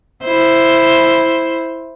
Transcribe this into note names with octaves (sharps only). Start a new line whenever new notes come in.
E4 C5